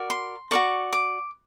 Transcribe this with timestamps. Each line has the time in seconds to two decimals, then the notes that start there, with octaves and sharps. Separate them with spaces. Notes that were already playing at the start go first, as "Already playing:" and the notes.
Already playing: F#4 A#4 D5
0.10 C6
0.51 F#4 A#4 D5 C#6
0.93 D6